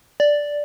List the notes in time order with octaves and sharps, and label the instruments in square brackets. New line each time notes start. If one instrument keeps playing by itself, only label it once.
[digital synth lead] D5